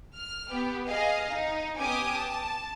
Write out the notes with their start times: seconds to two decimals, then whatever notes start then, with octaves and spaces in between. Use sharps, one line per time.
0.16 F6
0.50 B3 G4
0.87 G#4 D#5 F5
1.32 D#4
1.77 B3 C#4 G4 G#5 D6 D#6
2.16 A5